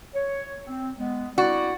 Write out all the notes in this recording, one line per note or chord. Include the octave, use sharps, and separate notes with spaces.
C#5
C4
G#3 B3
C4 E4 F#4 D5